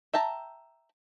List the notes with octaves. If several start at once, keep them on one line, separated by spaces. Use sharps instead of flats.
E5 G5 A5 A#5